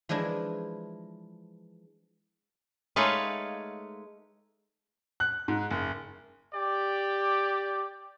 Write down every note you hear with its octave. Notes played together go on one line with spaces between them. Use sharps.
E3 F3 G#3 D4 E4
G#3 A3 D#4 B4 C#5 F5
F#6
G#2
F#1
G4 D5